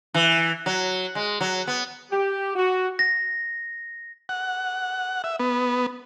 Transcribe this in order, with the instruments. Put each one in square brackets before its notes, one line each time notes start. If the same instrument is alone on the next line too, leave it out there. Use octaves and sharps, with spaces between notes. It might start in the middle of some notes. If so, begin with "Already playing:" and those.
[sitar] E3
F#3
G#3
F#3
B3
[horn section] G4
F#4
[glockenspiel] A#6
[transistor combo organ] F#5
E5
B3